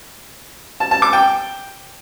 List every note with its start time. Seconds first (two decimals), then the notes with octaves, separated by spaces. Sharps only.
0.80 A5
0.91 A5
1.02 D6
1.13 G5